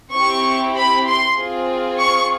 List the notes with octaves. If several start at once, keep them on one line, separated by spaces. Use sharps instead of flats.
C4 E4 G4 C#6
B5
C6
C4 F4 G#4
C#6